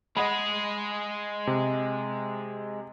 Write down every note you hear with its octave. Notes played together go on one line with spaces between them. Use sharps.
G#3 G#4 D#5 F#5 B5
C3